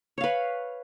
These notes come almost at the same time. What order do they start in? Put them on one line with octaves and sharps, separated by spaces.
C#5 F5 B4